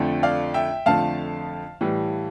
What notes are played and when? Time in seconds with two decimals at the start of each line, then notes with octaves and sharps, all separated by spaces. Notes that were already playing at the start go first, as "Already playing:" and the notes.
Already playing: F2 D3 F3 A3
0.23 D5 F5
0.54 E5 G5
0.86 F2 D3 F3 A3 F5 A5
1.81 A2 E3 G3